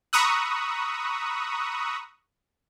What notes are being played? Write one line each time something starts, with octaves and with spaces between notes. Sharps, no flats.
A#5 B5 C#6 D#6 E6 F#6